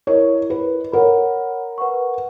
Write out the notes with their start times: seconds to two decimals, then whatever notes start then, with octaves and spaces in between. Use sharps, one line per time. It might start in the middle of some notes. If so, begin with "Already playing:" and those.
0.07 E4 A#4 C#5 D#5
0.50 B4
0.92 A#4 C#5 F#5 B5
1.78 B4 F#5 C#6